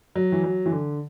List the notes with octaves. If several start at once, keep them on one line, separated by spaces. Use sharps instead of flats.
F#3
E3
F#3
E3
D3